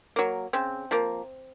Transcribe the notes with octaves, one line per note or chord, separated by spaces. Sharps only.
F#3 A#3
C#3 C4
F3 A#3